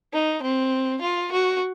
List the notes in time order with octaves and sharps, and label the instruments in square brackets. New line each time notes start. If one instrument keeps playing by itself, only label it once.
[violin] D#4
C4
F4
F#4